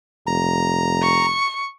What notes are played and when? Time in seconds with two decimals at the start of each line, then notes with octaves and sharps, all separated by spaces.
0.27 F1 A#5
1.02 C#6